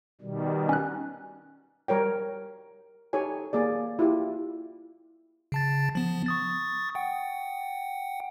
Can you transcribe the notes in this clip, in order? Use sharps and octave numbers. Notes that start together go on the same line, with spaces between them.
B2 D#3 G3
C#4 F#6
G3 A#4 C#5 G5
D#4 G4 A4 C#5 G#5
A#3 G#4 D5
E4 F4 G4
C#3 A5 A6
F3 B3
C#6 D#6 A6
F#5 G5